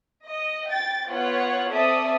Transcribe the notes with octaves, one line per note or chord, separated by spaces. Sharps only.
D#5
G5 A6
B3 F4 C#5 F#5
C4 A4 D5 E5 D#6